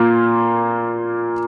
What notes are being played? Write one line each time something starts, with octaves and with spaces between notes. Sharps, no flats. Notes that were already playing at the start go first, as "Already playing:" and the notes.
Already playing: A#2 A#3 F4